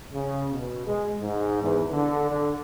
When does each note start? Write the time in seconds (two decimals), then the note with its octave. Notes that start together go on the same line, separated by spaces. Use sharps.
0.14 C#3
0.52 B2
0.87 G#3
1.21 G#2
1.62 E2
1.91 D3
2.30 D3